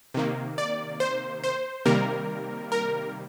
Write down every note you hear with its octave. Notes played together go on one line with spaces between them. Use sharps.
C3 D#3 A#3
D5
C5
C5
C3 D#3 G3 A#3 A#4
A#4